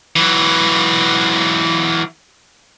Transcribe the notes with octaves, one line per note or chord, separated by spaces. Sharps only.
E3 F#3